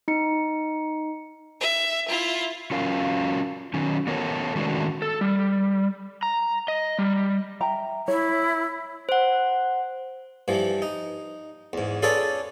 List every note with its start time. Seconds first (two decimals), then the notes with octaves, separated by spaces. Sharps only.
0.08 D#4 C#7
1.60 E5
2.08 E4 F4
2.71 F#3 C#4 F4 A#4 F5
3.74 D#3 F#3 C#4
4.07 B3 G4 A4 A#4 C#5
4.56 D#3 G#3 A3 C#4 D4 F#4
5.02 A4
5.21 G3
6.23 A#5
6.68 D#5
6.99 G3
7.60 E5 G5 A#5
8.08 E4 C#5
9.09 C5 F#5
10.48 G2 E3 F3
10.82 D#4
11.73 E2 G#2
12.02 C#4 F4 G#4 A4 B4 D5